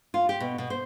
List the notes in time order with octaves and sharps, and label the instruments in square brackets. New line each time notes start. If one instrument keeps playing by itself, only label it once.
[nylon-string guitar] F4
G4
B2
B2
C5